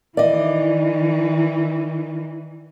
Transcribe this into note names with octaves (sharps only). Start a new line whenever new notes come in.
D#3 E3 D5 D#5